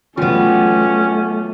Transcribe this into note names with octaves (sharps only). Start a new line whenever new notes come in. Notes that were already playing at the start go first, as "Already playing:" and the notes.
F#3 G3 A3 B3 C#4 F4